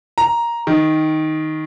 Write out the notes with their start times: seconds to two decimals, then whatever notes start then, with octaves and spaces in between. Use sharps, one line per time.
0.18 A#5
0.67 D#3